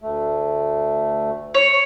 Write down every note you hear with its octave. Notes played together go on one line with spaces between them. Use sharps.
D2 A3
C#5